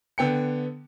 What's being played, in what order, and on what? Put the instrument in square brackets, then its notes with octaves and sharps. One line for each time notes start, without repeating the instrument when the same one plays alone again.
[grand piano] D3 B3 G5 C#7